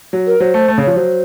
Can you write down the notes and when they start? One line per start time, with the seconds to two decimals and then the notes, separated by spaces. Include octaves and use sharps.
0.13 F#3
0.27 A#4
0.40 F#3 C5
0.54 A3
0.68 A3
0.78 C#3
0.82 C#5
0.87 F3
0.96 F#3 C5